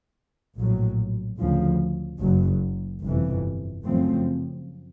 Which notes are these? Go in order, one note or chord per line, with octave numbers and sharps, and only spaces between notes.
A#1 A2 F#3
D2 C#3 F3
F#1 F#2 C#3 F#3
G1 F2 C3 E3
F#2 C#3 F3 A3 C4